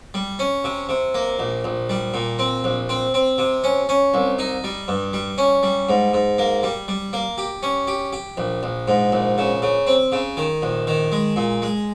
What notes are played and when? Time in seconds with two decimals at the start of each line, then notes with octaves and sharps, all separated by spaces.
0.14 G3
0.39 C#4
0.64 C3
0.89 C3
1.15 A#3
1.39 A#1
1.64 A#1
1.89 G3
2.14 A#2
2.39 C4
2.64 A#1
2.89 C4
3.14 C4
3.38 C3
3.64 C#4
3.89 C#4
4.14 C2
4.39 D#4
4.64 G3
4.88 G2
5.13 G3
5.38 C#4
5.63 G3
5.89 G#2
6.13 G#2
6.38 A#3
6.63 G3
6.88 G3
7.13 A#3
7.38 G4
7.63 C#4
7.87 G4
8.13 G4
8.37 A#1
8.63 A#1
8.88 G#2
9.12 A#1
9.38 C#3
9.62 C#3
9.87 C4
10.12 C#3
10.37 D#3
10.62 A#1
10.87 D#3
11.12 G#3
11.36 A#2
11.62 G#3